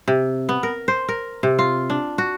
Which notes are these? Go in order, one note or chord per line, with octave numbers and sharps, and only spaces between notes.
C3
B3
A#4
C5
A#4
C3
F4
D4
F#4